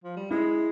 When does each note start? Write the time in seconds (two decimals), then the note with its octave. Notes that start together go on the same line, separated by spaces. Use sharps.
0.04 F3
0.16 G3
0.30 G#3 E4